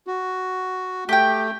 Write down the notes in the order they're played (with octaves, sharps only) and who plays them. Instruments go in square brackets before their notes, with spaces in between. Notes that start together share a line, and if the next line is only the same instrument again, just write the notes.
[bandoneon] F#4
[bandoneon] A3 [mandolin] G4 G5